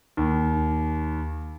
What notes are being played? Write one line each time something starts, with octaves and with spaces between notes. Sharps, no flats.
D#2